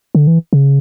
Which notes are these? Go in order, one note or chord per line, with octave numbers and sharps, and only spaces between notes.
D3
E3
C#3